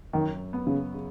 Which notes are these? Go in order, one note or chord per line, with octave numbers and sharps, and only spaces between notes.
F#2 D#3
B3
C#3
C#3